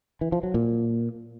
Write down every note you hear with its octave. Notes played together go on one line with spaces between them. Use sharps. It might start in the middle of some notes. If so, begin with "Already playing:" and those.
E3
F3
F#3
A#2